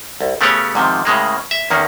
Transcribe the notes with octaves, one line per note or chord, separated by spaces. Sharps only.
C2
C#3 A3 B3 C#4 G4 C#5
G#2 C3 D#3 F3
A2 C#3 G#3 A#3
E5
E2 D#3 A#3 C#4